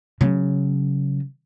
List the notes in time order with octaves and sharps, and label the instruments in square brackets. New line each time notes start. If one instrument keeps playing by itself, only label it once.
[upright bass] C#3 F#3